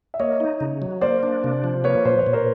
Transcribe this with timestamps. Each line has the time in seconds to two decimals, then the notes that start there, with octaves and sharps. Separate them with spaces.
0.14 E5
0.19 A#3 C#5 D#5
0.40 D#4
0.60 C#3
0.82 F#3
1.01 A#3 C5 D5
1.23 D4
1.44 C3
1.64 F3
1.84 A#3 B4 C#5
2.05 A#2 C5
2.19 C#5
2.27 A#2
2.33 A#4 C5